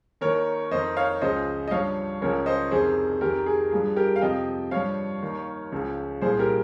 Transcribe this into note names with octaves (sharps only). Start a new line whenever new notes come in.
D#2 D#3 A#4 C#5
F2 D#3 C5 D#5
C#5 F5
C#2 C#3 F3 C5 D#5
D#5
G2 F3 C#5 F5
C#2 C#3 F3 A#4 C#5
C5 D#5
F2 C3 D#3 G#4 C5
F2 D#3 G4 A#4
G#4
G2 F3 G#4
G4 A#4
F5
F2 C3 F3 D#5 G5
G2 F3 C#5 F5
D#2 D#3
C#2 C#3 F3
C2 A#2 F3 G#4 C5
G4 A#4